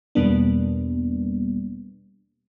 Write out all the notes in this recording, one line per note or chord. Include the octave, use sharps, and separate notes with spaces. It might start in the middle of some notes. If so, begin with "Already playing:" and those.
E2 B2 G3 A#3 B3 D4